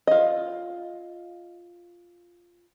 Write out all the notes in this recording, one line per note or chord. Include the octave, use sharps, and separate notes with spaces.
F4 D#5